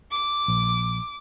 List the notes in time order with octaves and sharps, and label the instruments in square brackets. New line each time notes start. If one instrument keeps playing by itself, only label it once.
[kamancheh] D6
[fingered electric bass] A#1